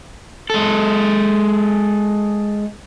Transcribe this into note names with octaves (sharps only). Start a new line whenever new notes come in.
G#3 A4